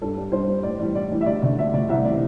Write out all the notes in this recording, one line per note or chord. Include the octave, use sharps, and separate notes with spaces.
G2 A4
G3
G2 C5
G3
A2 D5
E3 G3 D5
A2 D5
E3 G3
E5
D2 D5
D3 A3 D5
D2 E5
D3 A3 D5
C2 E5
C3 E3 D5